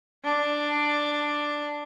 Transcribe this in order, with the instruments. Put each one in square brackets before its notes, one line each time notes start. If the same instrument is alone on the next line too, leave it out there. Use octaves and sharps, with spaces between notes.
[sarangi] D4